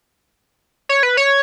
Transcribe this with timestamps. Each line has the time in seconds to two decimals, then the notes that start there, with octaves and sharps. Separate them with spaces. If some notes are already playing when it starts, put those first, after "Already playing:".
0.89 C#5
1.03 B4
1.17 C#5